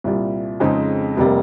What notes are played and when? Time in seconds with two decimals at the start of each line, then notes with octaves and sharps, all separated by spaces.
0.04 C2 A#2 G3
0.60 F2 C#3 G#3 C4 D#4
1.17 F1 C3 G3 A#3